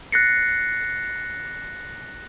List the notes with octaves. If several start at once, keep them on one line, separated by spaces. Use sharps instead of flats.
F#6 A6 A#6 C7 C#7